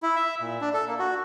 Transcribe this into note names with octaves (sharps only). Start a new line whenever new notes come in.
E4
E5
A#2
D4
A4
A#3
F#4